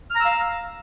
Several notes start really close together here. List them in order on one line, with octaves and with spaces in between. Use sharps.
F6 A#5 E6 F5